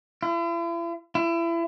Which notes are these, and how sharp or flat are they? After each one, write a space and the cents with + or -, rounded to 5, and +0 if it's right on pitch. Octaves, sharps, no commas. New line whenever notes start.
E4 +45
E4 +30